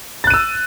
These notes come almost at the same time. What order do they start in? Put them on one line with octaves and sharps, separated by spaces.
A6 F#6 D#7 E6